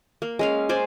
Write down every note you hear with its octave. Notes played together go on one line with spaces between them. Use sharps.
A#3
G#3 C#4 F5
C5 D5 G#5